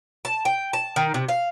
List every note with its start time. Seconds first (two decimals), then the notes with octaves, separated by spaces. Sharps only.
0.25 A5
0.45 G5
0.73 A5
0.96 D#3
1.14 C3
1.29 F5